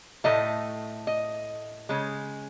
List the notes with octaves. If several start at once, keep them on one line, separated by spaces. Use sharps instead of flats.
A2 F#3 A3 D#5
D#5
C#3 G#3